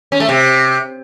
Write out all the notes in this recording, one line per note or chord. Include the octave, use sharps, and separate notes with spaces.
C#4
A3
C3